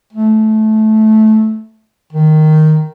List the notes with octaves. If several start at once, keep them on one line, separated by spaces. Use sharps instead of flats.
A3
D#3